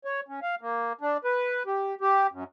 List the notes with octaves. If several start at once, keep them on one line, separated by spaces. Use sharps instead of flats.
C#5
C#4
F5
A#3
D4
B4
G4
G4
F#2